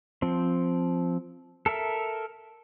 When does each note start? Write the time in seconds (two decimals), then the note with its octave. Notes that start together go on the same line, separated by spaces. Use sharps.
0.22 F3 C4
1.66 A4 A#4 E5